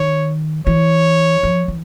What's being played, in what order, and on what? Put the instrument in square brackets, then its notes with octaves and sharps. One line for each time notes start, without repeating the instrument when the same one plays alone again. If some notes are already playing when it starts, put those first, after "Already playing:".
Already playing: [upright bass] D#3 [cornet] C#5
[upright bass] E3 [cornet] C#5
[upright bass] F3
E3